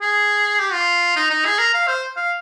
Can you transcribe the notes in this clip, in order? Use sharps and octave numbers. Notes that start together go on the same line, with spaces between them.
G#4
G4
F4
D#4
D#4
G#4
A#4
F5
C5
F5